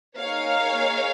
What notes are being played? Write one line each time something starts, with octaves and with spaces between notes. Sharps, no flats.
A#3 D#4 G#4 C#5 F5